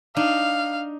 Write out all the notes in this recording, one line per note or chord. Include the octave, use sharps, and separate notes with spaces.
D4 D#4 F5